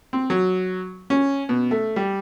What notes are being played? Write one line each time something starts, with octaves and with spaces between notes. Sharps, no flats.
C4
F#3
C#4
B2
A3
G3